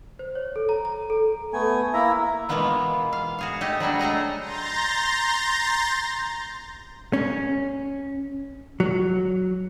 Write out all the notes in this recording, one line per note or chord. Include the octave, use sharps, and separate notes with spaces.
C5
C#5
A4
A#5
A#5
A4
A3 B3 G#5
A#3 E4 E5 A#5
B2 E3 G#3 A#3 B3 F4
F5
F#4 G#4 F5
A3 G4 G#4 D#5
F#3 G3 D4 F#4
A3 G#4 D#5 A#5
A#5 C6 G6 A6 A#6
C#4
F#3